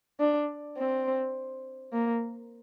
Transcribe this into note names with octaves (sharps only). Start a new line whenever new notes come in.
D4
C4
A#3